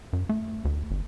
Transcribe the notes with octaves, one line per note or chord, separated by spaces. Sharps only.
F#2
A3
D2
G1